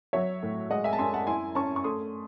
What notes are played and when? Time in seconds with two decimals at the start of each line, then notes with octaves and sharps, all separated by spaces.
0.13 F#3 C#5 E5
0.43 A2
0.70 G#3 D#5 F#5
0.84 E5 G#5
0.93 A5
0.98 F#2 G#5 C6
1.14 F#5 A5
1.27 E4 G#5 C6
1.55 C#4 A5 C#6
1.76 C#6
1.84 A3 C6 D#6